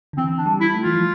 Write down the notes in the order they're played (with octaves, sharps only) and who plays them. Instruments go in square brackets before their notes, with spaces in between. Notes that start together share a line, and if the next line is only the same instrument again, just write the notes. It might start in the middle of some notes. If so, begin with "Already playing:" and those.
[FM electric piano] D3
[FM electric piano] E3 [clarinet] C4
[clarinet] D4
[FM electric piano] G3
[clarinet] E4
[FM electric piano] A3
[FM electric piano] E3 [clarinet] F4
[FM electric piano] F3